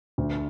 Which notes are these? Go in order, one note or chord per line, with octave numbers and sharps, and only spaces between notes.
D2